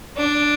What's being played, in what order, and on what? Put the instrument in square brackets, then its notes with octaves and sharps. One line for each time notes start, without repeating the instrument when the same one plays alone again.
[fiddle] D4